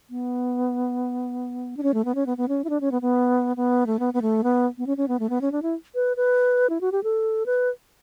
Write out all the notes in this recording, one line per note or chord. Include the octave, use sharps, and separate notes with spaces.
B3
D4
C#4
A3
B3
C#4
B3
B3
C#4
E4
D4
C#4
B3
B3
B3
A3
B3
B3
A3
B3
B3
C#4
C#4
B3
A3
B3
C#4
D4
E4
B4
B4
E4
F#4
G4
A4
B4